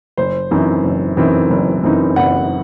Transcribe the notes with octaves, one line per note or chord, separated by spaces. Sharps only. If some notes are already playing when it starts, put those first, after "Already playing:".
F#1 C5
F#2 E3 C4 D#4
F#1
F#2 E3 C4 D#4
F#1
F#2 E3 C4 D#4
F#1 F#5